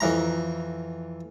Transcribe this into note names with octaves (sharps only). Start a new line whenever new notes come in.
F2 E3 A#5